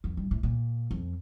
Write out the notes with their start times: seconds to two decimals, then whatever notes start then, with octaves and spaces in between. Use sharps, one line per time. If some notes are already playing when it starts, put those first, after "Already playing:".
0.04 F2
0.17 G2
0.31 A2
0.43 A#2
0.91 F2